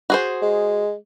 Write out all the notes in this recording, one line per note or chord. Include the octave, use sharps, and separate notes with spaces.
F#4 G#4 C5
G#3